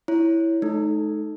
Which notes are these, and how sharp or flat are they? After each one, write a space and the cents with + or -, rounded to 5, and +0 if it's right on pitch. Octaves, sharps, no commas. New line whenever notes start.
E4 +0 C#5 +0
A3 -45 D#4 +0 A4 +0